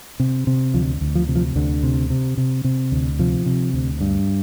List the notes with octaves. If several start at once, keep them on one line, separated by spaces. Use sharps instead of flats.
C3
C3
D2 F3
D2
F3
C3
F3
D2 D3
C3
C3
C3
C3
D2
C3 F3
C3
D2
G2